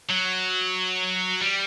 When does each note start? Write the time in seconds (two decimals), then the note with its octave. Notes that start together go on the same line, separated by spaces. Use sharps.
0.09 F#3
1.41 G3